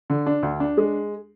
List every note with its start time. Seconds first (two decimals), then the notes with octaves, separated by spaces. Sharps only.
0.10 D3
0.26 D4
0.43 D2
0.60 D4
0.77 G#3